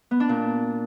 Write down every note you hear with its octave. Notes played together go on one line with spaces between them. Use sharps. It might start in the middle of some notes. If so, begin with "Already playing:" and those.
B3
D4
A#2